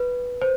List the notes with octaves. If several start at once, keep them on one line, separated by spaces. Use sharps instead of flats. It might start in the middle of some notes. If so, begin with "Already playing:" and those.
Already playing: B4
C5